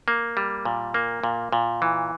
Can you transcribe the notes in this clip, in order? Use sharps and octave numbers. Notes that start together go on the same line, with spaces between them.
A#3
G3
A#2
A#3
A#2
A#2
E3